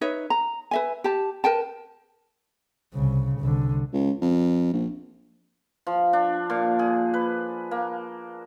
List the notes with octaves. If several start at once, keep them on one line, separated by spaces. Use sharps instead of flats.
D#4 B4 C#5 E5
A#5
B4 E5 G#5
G4 A5
A#4 B4 G5 A5
C2 C#3
C2 D3
C#2
F2
A#1
F3
D4
A#2
G#4
B4
A#3